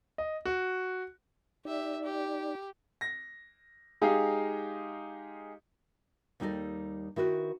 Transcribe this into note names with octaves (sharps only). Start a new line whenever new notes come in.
D#5
F#4
D#4 G4 D5 E5
G4
A#6
G#3 D#4 G4 G#4 F5
D#2 G3 D#4 A4 D5 D#5
D#3 E4 F#4 B4 C5